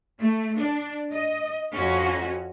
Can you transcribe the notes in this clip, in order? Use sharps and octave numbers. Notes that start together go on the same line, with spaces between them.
A3
D4
D#5
F2 C#4 F#4